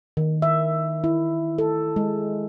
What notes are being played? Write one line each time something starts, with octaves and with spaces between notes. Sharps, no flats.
D#3
E5
E4
A4
G#3